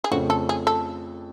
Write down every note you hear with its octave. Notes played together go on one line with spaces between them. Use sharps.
G#4
F2 C#3 F3 A3 C#4 F#4
A4
G#4
A4